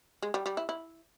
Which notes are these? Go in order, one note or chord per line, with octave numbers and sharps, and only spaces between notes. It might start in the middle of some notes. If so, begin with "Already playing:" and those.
G#3
G3
G3
E4
E4